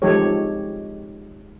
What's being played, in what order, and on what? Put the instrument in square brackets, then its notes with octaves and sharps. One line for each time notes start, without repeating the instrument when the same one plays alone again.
[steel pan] F3 G#3 D#4 G4 A4 C#5